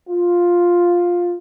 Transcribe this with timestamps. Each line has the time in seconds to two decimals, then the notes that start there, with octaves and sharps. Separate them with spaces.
0.08 F4